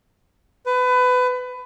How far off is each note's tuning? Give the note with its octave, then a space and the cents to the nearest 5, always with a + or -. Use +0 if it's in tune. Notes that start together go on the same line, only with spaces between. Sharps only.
B4 +25